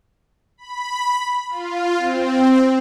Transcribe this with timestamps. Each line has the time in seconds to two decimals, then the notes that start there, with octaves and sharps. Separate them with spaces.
0.58 B5
1.50 F4
1.98 C4